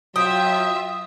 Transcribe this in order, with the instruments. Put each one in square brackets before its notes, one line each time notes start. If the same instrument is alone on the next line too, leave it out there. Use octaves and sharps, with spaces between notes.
[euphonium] F#3 [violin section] F4 E5 [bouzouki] G5 [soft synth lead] D#6